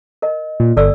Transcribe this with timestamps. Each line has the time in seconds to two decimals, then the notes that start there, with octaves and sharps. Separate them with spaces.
0.22 A#4 D#5
0.60 A#2
0.77 G1 A4 D5 E6